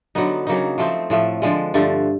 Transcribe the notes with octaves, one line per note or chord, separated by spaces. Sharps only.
D3 F#3 B3 D#4
C#3 F#3 A#3 D#4
F3 A3 C4
A2 F3 A3
D3 F3 G#3
G2 D3 F3 A3